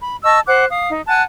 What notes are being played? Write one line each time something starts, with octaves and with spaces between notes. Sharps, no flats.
B5
D#5 A5 C#6 E6
C5 F#5 D6 F#6
F5 D#6
D#4
F#5 G#5 A5 F#6